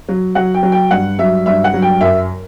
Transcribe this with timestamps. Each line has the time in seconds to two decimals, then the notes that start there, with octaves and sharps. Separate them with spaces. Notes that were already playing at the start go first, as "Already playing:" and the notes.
0.08 F#3
0.35 F#3 F#5
0.54 G5
0.63 F#3
0.72 G5
0.91 G2 F#5
1.19 F#3 E5
1.46 G2 E5
1.64 F#5
1.74 F#3
1.82 G5
2.01 F#2 E5